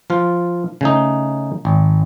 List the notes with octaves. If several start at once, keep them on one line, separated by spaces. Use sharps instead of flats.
F3 F4
C#3 A3 D#4
G#1